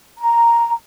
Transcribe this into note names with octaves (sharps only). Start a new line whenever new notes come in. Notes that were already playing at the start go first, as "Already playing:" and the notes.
A#5